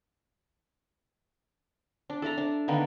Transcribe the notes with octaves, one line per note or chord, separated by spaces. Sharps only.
D4
A4 D5 E5 A#5
D4
D3 D#3 A#3 B3